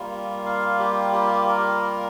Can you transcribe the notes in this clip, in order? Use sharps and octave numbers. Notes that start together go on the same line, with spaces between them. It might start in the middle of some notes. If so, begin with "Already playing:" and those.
Already playing: G3 A#3 F4
F5
G4
G4
A#4